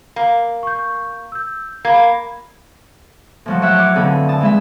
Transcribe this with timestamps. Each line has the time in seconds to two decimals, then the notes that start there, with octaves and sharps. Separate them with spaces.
0.16 A#3
0.63 C#6 G6
1.32 E6 G6
1.85 A#3 B5 G#6
3.46 A2 F3 F#3
3.62 F#3 C#5 E5 F#6
3.78 C#5 D6
3.95 F2 D3 E3 C4
4.29 A5 D#6
4.41 E3 G#3 E5